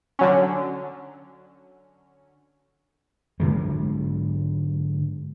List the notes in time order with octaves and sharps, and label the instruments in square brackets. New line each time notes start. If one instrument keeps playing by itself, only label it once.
[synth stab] D3 F#3 C#4
[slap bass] G#2 D3 F#3 G#3